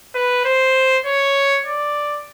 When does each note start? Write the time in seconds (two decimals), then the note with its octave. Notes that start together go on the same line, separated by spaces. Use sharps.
0.15 B4
0.45 C5
1.05 C#5
1.66 D5